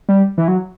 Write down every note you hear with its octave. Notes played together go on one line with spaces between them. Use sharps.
G3
E3
F#3